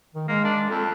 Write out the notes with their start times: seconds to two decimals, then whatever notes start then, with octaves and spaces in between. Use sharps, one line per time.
0.14 D#3
0.28 G#3 A#3
0.44 D4
0.70 F2 A4